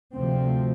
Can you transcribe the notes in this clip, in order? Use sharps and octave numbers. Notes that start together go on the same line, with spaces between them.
D2 C3 F3 C4